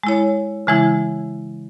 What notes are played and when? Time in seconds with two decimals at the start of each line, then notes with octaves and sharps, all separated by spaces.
0.04 G#3 E4 C#5
0.67 C#3 E3 G#3 E4